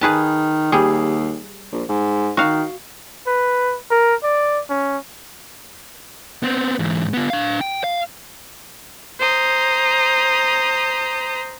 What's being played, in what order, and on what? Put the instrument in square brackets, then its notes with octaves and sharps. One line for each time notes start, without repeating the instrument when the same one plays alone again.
[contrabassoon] D#3 [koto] G#4 B4 A5
[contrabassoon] D#2 [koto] G3 G#4
[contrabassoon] A#1
G#2
[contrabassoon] D#3 [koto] F#4 F5
[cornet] B4
A#4
D5
C#4
[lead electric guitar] B3 C4
G#2 E3
B3 F4
D4 F5
G5
F5
[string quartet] C5 A#5 D#6